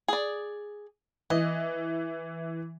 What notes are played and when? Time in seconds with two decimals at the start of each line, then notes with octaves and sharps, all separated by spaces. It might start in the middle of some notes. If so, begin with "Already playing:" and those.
0.08 G#4 D5
1.30 E3 D#5